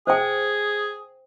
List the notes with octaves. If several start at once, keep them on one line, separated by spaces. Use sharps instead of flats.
G#4 C5 G5